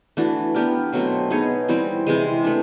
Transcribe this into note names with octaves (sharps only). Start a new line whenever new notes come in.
E3 A3 D4 F#4
B3 D4 G4 A#4
B2 F#3 A3 C4
B3 D#4 G#4 C#5
E3 G3 C4
C3 E3 G#3
A3 D4